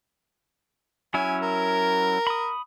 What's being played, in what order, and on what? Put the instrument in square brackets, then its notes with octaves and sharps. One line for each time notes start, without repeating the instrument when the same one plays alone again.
[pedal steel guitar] F#3 C#4 E4 [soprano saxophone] G#5
[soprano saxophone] A#4
[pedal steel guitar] B5 D#6